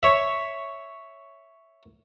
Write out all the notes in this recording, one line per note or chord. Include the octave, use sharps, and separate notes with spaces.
C#5 E5